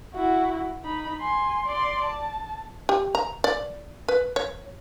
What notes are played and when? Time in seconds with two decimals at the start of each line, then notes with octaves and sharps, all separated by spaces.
0.14 E4 F#4
0.84 D#4 B5
1.20 G#5 C6
1.66 D5 C6
2.04 A5
2.89 G4
3.15 A#5
3.44 D5
4.08 B4
4.36 C#5